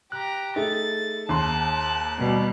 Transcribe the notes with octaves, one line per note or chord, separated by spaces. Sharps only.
G4 A#5 F#6
A3 D#4 G#4 A6
D#2 A5 C6 F#6
B2 G3